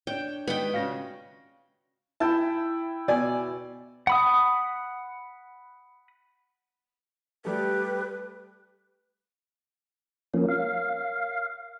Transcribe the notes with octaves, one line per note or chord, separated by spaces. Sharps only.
D4 C#5 G5
D#3 G3 G#3 B3 B4 F#5 G5 B5
C#3 C#4 D4 F4 F#4 F5 A#6
E4 G5 A5
B2 D5 G#5
F#5 B5 D#6
G3 A3 G4 B4
F3 A#3 C#4 A#4 C#5
F5